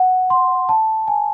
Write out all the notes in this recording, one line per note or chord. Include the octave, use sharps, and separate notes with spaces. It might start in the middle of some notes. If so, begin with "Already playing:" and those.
Already playing: F#5
C6
A5
G#5